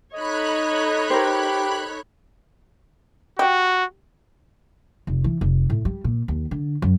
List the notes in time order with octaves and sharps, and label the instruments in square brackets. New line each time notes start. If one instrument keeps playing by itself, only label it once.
[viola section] D#4 A4 C#5 [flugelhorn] D#5 [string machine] B5 F#6
[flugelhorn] G4 [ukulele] A#4 C5
[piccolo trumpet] F#4 [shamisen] G4
[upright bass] F1
E3
F1
A2
G3
A#2
D#2
D3
F#2